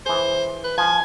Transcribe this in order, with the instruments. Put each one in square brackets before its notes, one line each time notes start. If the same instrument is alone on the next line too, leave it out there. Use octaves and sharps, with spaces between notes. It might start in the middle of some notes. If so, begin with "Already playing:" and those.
[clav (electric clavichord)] E3 G#4 [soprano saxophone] C5
[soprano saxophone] B4
[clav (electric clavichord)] F3 [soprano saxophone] G#5